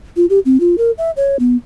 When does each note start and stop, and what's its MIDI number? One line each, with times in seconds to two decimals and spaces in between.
0.17 0.26 65
0.30 0.39 67
0.45 0.60 60
0.60 0.76 65
0.78 0.91 70
0.98 1.11 76
1.17 1.37 73
1.39 1.56 59